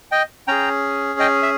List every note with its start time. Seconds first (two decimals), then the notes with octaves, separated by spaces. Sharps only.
0.12 D#5 G5
0.48 C#4 G#4 G5 A#5
1.19 D#5 G5
1.43 E5